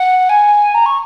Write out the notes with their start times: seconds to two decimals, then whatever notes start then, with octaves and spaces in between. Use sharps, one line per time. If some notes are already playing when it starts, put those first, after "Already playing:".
Already playing: F#5
0.29 G#5
0.74 A#5
0.86 C#6